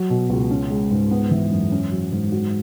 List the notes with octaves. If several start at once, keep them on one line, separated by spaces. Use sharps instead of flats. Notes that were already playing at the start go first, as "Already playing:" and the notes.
Already playing: F#3
B2
C#2
C#4
G#3
G#2
B3
E3
F#2
C#4
F#3
G#2
F#4